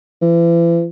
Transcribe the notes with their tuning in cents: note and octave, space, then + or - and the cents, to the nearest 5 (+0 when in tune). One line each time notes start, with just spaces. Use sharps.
E3 +40